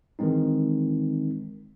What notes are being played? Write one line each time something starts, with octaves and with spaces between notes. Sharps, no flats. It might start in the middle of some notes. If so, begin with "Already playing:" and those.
D#3 E3 G#3 C4 D#4